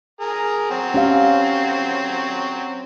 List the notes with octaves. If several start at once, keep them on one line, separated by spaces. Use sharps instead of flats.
G#4 A#4
F#3 C4
C#4 G4 F5